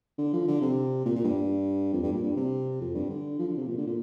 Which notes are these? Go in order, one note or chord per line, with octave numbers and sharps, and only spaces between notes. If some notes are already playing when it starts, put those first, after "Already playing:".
D3
F3
D3
C3
A#2
A#2
G2
F2
G2
A#2
G2
C3
F2
G2
D3
F3
D3
C3
A#2
D3
A#2